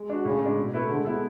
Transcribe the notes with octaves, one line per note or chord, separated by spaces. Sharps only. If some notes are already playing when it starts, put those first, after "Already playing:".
Already playing: G#3
D4 F#4
A2 C#3
G#3 D4
B2
A3 E4 B4
D3 G#3
B3 E4 A4